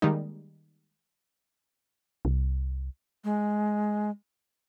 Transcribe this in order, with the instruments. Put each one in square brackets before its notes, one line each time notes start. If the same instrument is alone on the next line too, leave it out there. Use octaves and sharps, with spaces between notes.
[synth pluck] D#3 G3 G#3 A#3 D#4
[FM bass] C2
[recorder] G#3